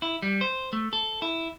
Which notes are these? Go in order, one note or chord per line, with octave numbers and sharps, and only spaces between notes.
E4
G3
C5
A3
A4
E4